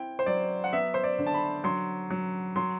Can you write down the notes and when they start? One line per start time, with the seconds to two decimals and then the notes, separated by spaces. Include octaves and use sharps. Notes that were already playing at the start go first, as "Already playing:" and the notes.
Already playing: C4 E4 G5
0.19 C5
0.26 F#3 D5
0.64 F#5
0.73 B3 E5
0.94 C5
1.04 D5
1.19 D3
1.27 A5
1.34 B5
1.64 F#3 C6
2.10 F#3
2.56 F#3 C6